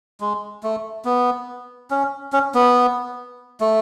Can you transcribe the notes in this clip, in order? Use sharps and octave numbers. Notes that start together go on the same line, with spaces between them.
G#3
A3
B3
C#4
C#4
B3
A3